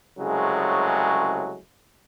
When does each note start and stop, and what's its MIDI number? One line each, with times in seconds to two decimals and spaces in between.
0.19 1.58 36
0.19 1.58 49
0.19 1.58 54
0.19 1.58 56
0.19 1.58 57